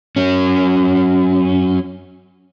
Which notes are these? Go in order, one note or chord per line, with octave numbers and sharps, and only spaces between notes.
F#3 C#4